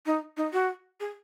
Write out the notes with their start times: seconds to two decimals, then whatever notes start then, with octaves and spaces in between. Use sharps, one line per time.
0.06 D#4
0.37 D#4
0.53 F#4
1.00 G#4